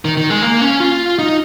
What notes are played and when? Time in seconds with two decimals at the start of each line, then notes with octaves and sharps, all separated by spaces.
0.05 D#3
0.17 D#3
0.30 G#3
0.42 A#3
0.61 C#4
0.80 F4
1.19 D#4